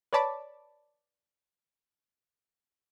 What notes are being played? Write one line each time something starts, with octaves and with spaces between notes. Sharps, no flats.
B4 C#5 D5 A5 B5 D6